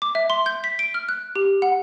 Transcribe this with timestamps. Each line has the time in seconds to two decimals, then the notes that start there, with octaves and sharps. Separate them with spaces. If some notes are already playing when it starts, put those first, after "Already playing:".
0.02 D6
0.15 E5
0.30 C6
0.46 G6
0.64 B6
0.79 D7
0.94 F6
1.09 F#6
1.36 G4
1.62 F#5